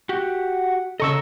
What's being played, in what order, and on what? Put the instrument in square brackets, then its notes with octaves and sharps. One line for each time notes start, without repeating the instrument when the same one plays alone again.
[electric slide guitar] F#4 G4 [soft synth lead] F#5
[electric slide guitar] C#3 D#5 [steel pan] A4 C#6 E6 [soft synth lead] A#5